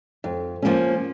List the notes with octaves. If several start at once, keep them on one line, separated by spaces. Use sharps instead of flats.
F2
F3 A#3 C#4